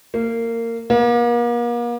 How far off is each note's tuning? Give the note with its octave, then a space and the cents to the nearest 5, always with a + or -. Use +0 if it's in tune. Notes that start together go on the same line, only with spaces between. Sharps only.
A#3 -20
A#3 +40